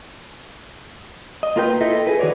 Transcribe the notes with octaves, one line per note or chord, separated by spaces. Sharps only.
D#5
A#3 F4 A#4 B4 G5
E4 F4 A4 D#5 E5
G#4 B4
D#3 F#4 C#5 D5